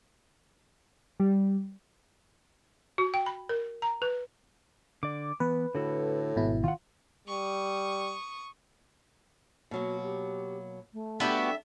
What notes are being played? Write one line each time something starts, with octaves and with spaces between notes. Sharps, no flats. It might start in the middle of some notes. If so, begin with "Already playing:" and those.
G3
F#4
G5
B5
A#4
A#5
B4
D3 D5 D6
E3 B3 B4
A2 D3 F#4 A4
G#1 B2 E4
D#3 F4 F#5
G3 C#6 D#6
B2 F#3 A#3 F#4
G4
A3
G3 B3 D4 F#4 G4 A4 E5